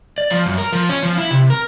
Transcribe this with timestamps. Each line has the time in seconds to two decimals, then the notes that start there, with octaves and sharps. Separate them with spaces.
0.18 D5
0.30 F3
0.46 F#2
0.58 A#4
0.73 F3
0.89 C#4
1.03 F3
1.18 E4
1.31 C3
1.50 A#4